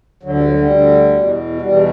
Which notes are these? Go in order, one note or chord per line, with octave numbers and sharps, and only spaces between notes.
D2 D3 F#3
G3
F#3
G3
D2 D3
E2 B2
E2 B2 G3